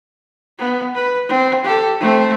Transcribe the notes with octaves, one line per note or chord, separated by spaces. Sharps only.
B3
B4
C4
G4 A4
A3 C4